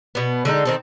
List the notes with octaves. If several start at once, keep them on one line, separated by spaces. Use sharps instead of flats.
B2 B3
D3 G#3 D#4
D#3 C4 A4